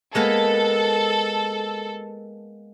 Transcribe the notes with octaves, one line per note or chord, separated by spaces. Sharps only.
G#3 A#3 B3 A4